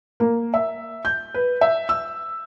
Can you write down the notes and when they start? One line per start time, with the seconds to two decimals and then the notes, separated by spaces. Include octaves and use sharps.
0.20 A#3
0.54 E5
1.05 G6
1.34 B4
1.61 E5
1.89 E6